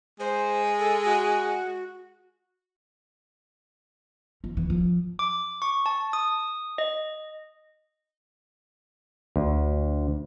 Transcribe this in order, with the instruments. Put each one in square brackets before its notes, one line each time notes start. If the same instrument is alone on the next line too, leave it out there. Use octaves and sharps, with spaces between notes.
[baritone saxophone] G#3 [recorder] C5
[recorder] A4
F#4
[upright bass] F3
E3
F3
[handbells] D6
C#6
A5
D#6
D#5
[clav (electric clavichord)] D2